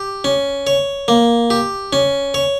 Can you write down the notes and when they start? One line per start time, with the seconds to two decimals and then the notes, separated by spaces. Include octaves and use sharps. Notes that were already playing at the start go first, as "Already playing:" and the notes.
Already playing: G4
0.24 C#4
0.67 C#5
1.08 A#3
1.50 G4
1.93 C#4
2.34 C#5